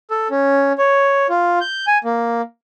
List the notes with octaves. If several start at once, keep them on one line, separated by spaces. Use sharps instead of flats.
A4
C#4
C#5
F4
G6
G#5
A#3